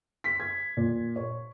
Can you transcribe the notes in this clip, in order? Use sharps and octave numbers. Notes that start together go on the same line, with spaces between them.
B6
G#6
A#2
C#5